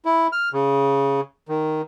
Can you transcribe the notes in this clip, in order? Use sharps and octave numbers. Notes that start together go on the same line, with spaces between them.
E4
F6
C#3
D#3